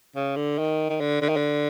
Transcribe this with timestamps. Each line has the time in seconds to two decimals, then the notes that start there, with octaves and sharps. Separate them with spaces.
0.16 C#3
0.36 D3
0.58 D#3
0.90 D#3
1.00 D3
1.22 D3
1.29 D#3
1.36 D3